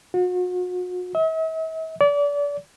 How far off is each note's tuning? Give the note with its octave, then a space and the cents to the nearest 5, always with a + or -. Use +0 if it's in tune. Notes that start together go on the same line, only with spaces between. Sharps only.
F#4 -40
E5 -45
D5 -30